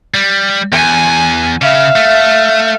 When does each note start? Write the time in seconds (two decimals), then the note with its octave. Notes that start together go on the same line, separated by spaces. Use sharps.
0.14 G3
0.72 E2 G#5
1.62 C#3 E5 F5
1.96 A3